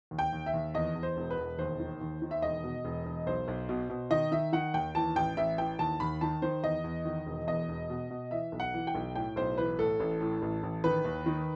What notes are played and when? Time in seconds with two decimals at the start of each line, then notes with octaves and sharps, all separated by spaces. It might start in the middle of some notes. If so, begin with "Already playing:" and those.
0.11 D#2
0.19 G5
0.33 D#2
0.46 E5
0.54 D#2
0.75 E2 D#5
0.95 E2
1.03 C5
1.17 E1
1.30 B4
1.37 E1
1.59 D#2 C5
1.80 D#3
2.01 D#2
2.22 D#3
2.31 E5
2.42 E1 D#5
2.64 B2
2.85 E1
3.06 E1
3.27 B1 C5
3.48 B1
3.69 B2
3.90 B2
4.11 D#3 D#5
4.32 D#3 E5
4.53 D#3 F#5
4.74 D#2 G5
4.95 E3 A5
5.16 A1 G5
5.37 A1 E5
5.58 E3 G5
5.79 D#2 A5
6.00 D#2 B5
6.21 D#3 A5
6.42 D#3 C5
6.63 E2 D#5
6.84 E2
7.05 D#3
7.27 E1
7.47 E2 D#5
7.69 E1
7.90 B2
8.11 B2
8.31 E3 E5
8.52 B1
8.60 F#5
8.74 E3
8.87 G5
8.95 B1
9.15 A2 G5
9.36 B1 C5
9.58 E3 B4
9.78 A2 A4
10.00 A1
10.20 A2
10.42 A1
10.63 A1
10.84 D#3 B4
11.05 D#2
11.26 D#3